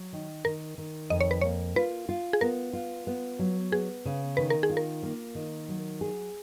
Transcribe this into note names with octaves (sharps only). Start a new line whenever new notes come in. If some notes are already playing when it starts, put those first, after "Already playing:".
Already playing: F#3
D#3
D#3 A#4
D#3
F2 D#5
C#5
B4
A#3 C#5
F4 B4
F4
G#4
B3 A#4
F4
B3
F#3
B3 G#4
C#3
D#3 B4
A#4
G#4
F4
A#4
A#3
D#3
F#3
G#4